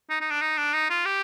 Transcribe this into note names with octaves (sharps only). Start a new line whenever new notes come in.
D#4
D#4
D4
D#4
D4
D#4
F4
G4